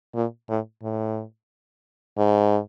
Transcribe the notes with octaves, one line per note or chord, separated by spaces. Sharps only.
A#2
A2
A2
G#2